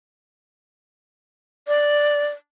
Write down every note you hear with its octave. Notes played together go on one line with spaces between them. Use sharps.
D5